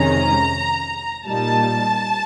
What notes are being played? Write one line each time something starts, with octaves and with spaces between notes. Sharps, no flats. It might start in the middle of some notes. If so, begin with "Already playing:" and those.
Already playing: F2 C3 D#3 G#3 C#4 A#5
A#2 G3 A#3 D#4 A5